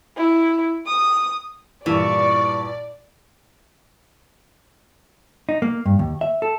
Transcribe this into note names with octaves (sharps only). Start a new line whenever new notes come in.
E4
D#6
G2 A#2 E3 D5 C#6
D#4
A#3
G2
D#2
E5
A4